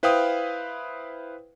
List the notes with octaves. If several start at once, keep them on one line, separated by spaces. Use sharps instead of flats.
E4 B4 C5 F5 G5 D#6